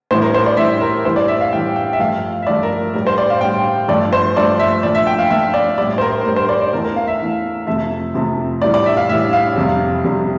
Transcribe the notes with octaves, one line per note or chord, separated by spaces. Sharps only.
A2 E3 G3 C5
A#4
C5
D5
A2 E3 G3 E5
A#4
A2 E3 G3 C5
D5
E5
F5
A2 E3 G3 G5
G5
E5
G2 F3 A3 F5
E5
G2 F3 A3 D5
A#4
A2 G3 A#4
C5
D5
F5
A2 G3 G5
G2 F3 A3 D5
C5
G2 F3 A3 D5
E5
A#2 F3 A3 D5
E5
G5
F5
A#2 F3 A3 E5
D5
A2 G3 D5
C5
A#4
A2 G3 A#4
C5
D5
D5
E2 E3 A3 A#4
A#4
F5
E5
E2 E3 A3
F2 C3 F3 A3 E5
F2 C3 F3 A3
A2 E3 G3 D5
D5
E5
F5
A2 E3 G3 E5
F5
F2 C3 G3
F2 C3 G3